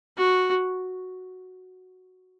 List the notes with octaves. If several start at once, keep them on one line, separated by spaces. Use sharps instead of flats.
F#4